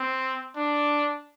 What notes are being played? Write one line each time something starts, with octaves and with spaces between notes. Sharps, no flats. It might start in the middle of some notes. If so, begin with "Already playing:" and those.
Already playing: C4
D4